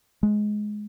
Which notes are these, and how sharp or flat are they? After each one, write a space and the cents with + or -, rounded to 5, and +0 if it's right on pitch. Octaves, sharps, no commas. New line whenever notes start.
G#3 +15